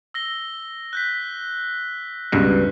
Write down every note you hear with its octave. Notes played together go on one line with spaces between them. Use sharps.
E6 A#6 G7
F#6 G6 B6
C#2 G2 B2 F#6